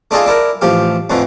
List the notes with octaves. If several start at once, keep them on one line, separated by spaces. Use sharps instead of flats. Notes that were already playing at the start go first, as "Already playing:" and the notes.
A3 D4 D#4 F4 G#4 A4
D4 E4 A#4
A1 F3 G4 F5
F2 A2 D3 E3